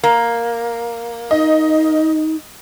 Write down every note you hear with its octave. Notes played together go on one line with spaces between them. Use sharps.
A#3
D#4 D#5